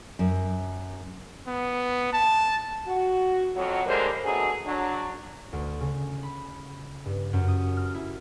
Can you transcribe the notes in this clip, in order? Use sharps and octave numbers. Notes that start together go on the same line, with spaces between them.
F#2
B3
A5
F#4
F2 F#3
D3 G3 G#3 A#3 C5
B2 F#3 A3 D4 G#4
F#3 D4
D2
C#3
B5
G2
F#2
D#6
F6
E4